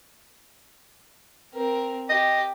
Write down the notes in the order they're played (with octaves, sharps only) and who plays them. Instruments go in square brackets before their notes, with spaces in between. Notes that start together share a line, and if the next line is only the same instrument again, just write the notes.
[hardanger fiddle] C4 A#4
[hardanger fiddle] G4 [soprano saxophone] D#5